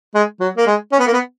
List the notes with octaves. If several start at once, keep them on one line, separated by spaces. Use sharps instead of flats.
G#3
F#3
A#3
G#3
C#4
B3
A#3
B3